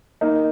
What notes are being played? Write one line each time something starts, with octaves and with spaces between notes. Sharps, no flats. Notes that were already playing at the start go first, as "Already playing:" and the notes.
A#3 D#4